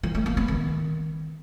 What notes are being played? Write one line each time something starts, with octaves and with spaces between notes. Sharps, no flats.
E3
A3
A#3
B3
D#3